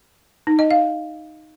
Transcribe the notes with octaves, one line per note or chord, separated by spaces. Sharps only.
D#4
D#5
F5